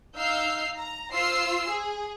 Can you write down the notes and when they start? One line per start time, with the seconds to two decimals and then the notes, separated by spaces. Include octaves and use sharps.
0.16 D#4 F5 E6 G6 C7
0.77 A#5
1.13 F4 C5 E6 C7
1.69 G#4